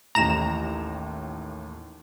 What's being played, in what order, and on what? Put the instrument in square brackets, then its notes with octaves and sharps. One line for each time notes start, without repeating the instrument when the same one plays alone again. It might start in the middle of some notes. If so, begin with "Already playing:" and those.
[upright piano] A1 D#2 A2 [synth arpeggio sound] A#5 E7